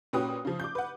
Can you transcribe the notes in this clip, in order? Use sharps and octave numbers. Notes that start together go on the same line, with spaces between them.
A#2 C#4 F#4 B4 G5 D#6
C#3 F3
D6 G6
B4 F#5